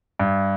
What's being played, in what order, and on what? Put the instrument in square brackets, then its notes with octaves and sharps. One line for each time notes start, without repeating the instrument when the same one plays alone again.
[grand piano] G2